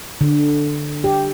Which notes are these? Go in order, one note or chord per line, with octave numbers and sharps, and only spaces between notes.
D3
G4